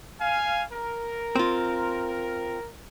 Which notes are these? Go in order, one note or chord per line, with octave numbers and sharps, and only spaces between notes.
F5 G#5
A#4
C4 F4